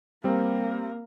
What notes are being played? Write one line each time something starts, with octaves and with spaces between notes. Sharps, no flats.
G3 A#3 C4 A#4